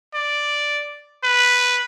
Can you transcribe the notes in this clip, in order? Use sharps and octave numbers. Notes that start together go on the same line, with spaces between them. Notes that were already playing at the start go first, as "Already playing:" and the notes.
D5
B4